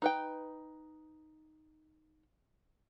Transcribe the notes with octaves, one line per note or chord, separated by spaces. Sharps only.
D#4 B4 G5